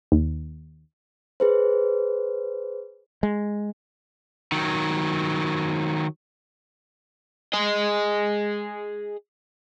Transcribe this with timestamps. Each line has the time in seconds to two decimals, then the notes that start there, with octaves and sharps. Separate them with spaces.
0.12 D#2
1.40 G#4 B4 C5
3.23 G#3
4.52 D#3 F#3
7.54 G#4 D#5